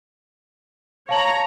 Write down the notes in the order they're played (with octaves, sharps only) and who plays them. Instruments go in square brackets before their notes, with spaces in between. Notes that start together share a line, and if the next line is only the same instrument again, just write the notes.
[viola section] C#5 A#5 [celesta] F5 A5 F#7